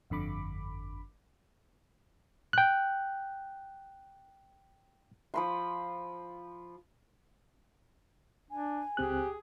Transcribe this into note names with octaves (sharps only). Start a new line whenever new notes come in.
G1 F2 D3 B5 D6
G5 F#6
F3 B5 C6
D4 G#5
C#2 C4 G4 G#4 F#6